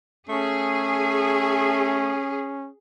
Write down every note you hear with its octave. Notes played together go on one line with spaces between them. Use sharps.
A3 C#4 G#4